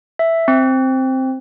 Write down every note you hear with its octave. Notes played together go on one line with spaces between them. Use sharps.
E5
C4